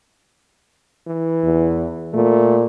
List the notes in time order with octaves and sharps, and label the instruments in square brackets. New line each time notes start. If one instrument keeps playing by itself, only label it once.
[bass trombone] E3
[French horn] E2
[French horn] A#2 [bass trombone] A3